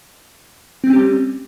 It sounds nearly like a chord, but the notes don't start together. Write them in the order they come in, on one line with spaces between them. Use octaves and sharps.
C4 A3 C#4 G4 G3